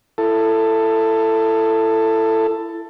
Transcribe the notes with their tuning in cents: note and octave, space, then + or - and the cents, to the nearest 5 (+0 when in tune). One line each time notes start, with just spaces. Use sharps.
E4 +25 A4 +10